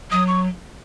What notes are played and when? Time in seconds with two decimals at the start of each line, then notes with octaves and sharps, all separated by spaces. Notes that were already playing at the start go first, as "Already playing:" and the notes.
0.11 F#3 D#6
0.28 C#6